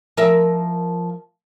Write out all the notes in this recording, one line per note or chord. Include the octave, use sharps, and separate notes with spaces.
F3 A#4 E5